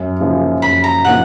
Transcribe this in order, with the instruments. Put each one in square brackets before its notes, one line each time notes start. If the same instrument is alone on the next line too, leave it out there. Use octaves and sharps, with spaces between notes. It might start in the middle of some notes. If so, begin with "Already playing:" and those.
Already playing: [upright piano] F#2
C#3 F3 A#3 D#4
[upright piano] F#2 [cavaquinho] B5
[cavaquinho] A#5
[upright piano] C#3 F3 A#3 D#4 [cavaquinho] F#5